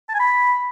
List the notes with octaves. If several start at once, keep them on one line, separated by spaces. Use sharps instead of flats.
A5
G#5
B5